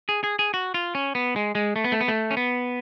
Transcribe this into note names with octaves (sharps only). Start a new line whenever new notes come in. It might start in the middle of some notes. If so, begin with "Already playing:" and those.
G#4
G#4
G#4
F#4
F4
C#4
B3
G#3
G#3
A3
B3
A3
B3
A3
C#4
B3